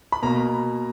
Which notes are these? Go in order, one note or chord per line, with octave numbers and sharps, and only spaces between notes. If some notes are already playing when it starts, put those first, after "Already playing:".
B5
B2 A#3 A#5